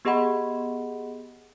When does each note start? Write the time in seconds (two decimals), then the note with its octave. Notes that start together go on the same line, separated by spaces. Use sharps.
0.05 B3 G4 G#4 D#5 F#5 B5